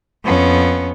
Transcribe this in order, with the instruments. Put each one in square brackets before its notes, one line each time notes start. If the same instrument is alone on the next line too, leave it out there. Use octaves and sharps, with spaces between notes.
[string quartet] F2 B3 C#4